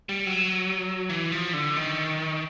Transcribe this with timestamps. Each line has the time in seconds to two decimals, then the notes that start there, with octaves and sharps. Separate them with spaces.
0.09 G3
0.26 F#3
1.10 E3
1.32 F3
1.53 D3
1.76 D#3